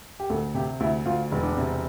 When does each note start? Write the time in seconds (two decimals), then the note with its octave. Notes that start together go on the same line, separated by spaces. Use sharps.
0.20 G4
0.30 D2 A4
0.54 C3 G4
0.80 D2 E4
1.05 D2 F4
1.32 E1
1.43 D4
1.57 C3